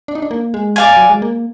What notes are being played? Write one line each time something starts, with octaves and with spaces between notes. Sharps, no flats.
D4
D#4
D4
A#3
G#3
D5 F5 G#5
F#3
G#3
A#3